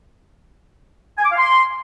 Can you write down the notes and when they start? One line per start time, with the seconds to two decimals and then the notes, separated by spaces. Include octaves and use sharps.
1.18 G#5
1.25 D6
1.32 F5
1.38 C6